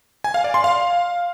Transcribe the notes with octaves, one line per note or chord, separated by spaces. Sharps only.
G#5
F5
D5
C6
F5